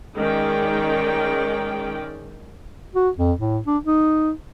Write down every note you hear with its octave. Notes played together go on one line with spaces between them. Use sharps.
D#3 G#3 C#4 D5 G5
F#4
F2
A2
D4
D#4